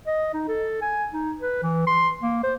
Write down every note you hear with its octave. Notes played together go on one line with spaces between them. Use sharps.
D#5
D#4
A4
G#5
D#4
B4
E3
C6
A#3
C5